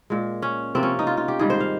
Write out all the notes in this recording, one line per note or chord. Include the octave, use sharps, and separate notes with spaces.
A#2 G#3
C#4
C3 F3 A#3 C4
C#4
D#4
F4
F4
G4
G#2 D#3 G3 G#4
C5
F5